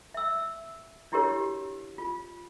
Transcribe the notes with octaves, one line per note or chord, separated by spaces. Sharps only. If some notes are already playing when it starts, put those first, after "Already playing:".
E5 E6
D4 E4 F#4 G4 A#4 C#5
F4